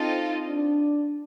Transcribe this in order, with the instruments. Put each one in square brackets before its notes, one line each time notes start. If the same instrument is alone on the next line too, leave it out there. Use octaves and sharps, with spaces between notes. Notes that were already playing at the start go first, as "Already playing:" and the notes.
Already playing: [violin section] C4 F4 A4 D#5 [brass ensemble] D#4
[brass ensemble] D4